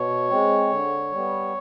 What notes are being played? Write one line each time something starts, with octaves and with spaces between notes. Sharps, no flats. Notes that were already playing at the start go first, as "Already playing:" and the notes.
Already playing: B2 C#5
G#3 C4
D3
G3 B3